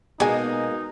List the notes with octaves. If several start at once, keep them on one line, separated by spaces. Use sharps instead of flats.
B2 G#3 A#3 D#4 G#4 G#5